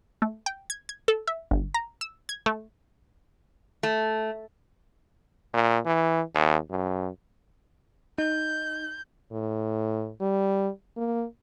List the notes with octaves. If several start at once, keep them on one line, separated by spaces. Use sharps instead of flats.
A3
G5
G#6
G#6
A4
E5
G1
A#5
E6
G#6
A3
A3
A#2
E3
D#2
F#2
D#4 G6
A2
G3
A#3